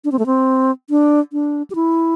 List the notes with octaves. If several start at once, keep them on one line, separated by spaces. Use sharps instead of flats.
D4
C4
A3
C4
D4
D4
G4
E4